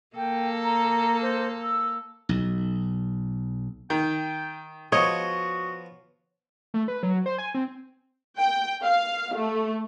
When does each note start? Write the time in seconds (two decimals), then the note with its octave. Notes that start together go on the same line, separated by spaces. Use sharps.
0.16 A#3 A4 G5
0.64 A#5
1.22 C5
1.64 E6
2.29 B1
3.90 D#3 G5
4.92 F3 B3 F#4 C#5 D#5
6.74 A3
6.88 B4
7.03 F#3
7.26 C5
7.38 G#5
7.54 C4
8.39 G5
8.84 F5
9.37 A3